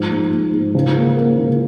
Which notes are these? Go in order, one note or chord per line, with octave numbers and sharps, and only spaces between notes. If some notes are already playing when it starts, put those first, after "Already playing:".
Already playing: G#2 F3
G#2
G#2
G#2
C#2
A#3
A#3
C#2